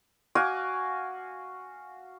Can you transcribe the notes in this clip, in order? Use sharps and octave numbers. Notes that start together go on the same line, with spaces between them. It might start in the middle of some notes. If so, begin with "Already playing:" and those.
F#4 F5 G#5 D6